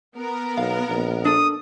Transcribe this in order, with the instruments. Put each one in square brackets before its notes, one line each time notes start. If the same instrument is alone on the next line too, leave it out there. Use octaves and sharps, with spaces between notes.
[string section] B3 A#4
[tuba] B1 [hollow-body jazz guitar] F5
[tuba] A#1
[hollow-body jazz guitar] D4 A4 [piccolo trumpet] D#6